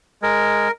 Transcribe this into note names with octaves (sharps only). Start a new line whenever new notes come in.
G#3 A#4